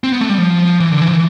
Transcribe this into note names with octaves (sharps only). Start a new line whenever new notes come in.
C4
B3
A3
G3
F3
E3
D3
E3
F3
E3